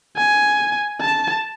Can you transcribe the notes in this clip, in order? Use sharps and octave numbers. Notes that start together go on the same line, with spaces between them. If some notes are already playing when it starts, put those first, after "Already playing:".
G#5
A5